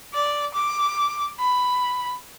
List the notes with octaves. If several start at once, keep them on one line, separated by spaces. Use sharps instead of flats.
D5
D6
B5